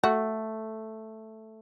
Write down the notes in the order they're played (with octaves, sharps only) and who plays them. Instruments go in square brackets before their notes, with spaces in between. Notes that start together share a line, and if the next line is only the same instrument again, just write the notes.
[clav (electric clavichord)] A3 [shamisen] F#4